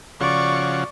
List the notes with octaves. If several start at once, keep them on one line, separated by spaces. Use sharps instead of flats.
C#3 F3 F#4 D5 C#6